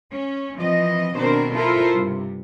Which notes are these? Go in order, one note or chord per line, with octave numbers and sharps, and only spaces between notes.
C#4
E3 F3 C4 D#5
B2 D#3 C4 D4 A#4 C5
E4 F4 A4 A#4 C5
G2 C3